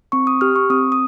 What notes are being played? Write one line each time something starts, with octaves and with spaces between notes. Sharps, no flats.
C4 C#6
D#6
G4 F6
C#6
C4 D#6
D#6